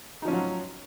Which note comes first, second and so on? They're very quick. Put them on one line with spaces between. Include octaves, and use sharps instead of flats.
D#4 F3 C#4 F4 F#3